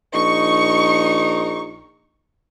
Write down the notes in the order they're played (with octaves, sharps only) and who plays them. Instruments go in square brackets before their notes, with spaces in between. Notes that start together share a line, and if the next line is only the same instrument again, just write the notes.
[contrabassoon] A#1 [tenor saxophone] D#4 [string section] C#6